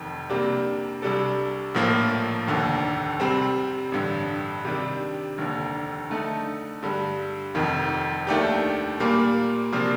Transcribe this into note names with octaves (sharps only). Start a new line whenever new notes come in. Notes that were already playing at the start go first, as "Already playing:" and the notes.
Already playing: F1 F2 D#3
C3 G3 A#3 D4
C2 C3 G3 D4 A4
A#1 A2 F3 A#3
F1 D#2 D3
C3 G3 C4
A1 G2 D3
C3 D#3 G3 D4
F1 D#2 D3
D3 A3 D#4 A4
G2 D3 G3
F1 F2 D#3
D#2 D#3 A3 D4 G4
A#2 G3 A#3
C3 F3 A#3 D4